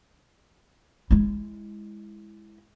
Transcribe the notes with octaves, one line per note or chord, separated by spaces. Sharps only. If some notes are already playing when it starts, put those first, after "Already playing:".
G#3 E4